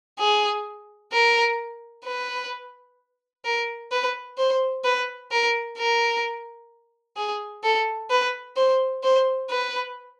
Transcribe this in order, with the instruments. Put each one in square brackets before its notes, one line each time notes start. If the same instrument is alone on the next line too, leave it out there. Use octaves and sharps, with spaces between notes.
[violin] G#4
A#4
B4
A#4
B4
C5
B4
A#4
A#4
G#4
A4
B4
C5
C5
B4